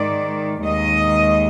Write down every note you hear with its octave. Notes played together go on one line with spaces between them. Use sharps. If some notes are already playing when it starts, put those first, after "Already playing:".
Already playing: G#2 D#3 G#3 D5
D#2 D#3 G#3 D#5